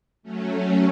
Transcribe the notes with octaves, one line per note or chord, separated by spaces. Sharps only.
F#3 A3 C#4